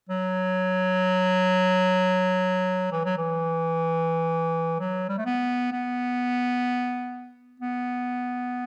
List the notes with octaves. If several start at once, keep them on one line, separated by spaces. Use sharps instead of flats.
F#3
E3
F#3
E3
F#3
G3
A3
B3
B3
B3